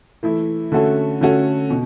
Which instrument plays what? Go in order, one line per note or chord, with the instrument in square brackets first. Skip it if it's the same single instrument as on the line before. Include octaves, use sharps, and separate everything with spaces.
[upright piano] E3 A3 E4
D3 A3 C#4 F#4 A4
D3 A3 C#4 F#4 A4
B2